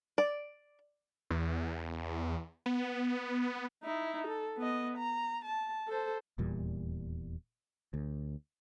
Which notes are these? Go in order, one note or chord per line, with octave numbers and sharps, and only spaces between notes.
D5
E2
B3
D#4 E4
A4
B3 D#5
A#5
A5
A4 C5
D#1 E2 A#2 G3
D2